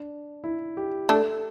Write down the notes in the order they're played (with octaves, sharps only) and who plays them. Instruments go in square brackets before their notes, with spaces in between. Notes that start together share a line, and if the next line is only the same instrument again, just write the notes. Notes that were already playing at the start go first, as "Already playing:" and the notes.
Already playing: [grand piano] D4
E4
G4
[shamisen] A3 D4 [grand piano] A4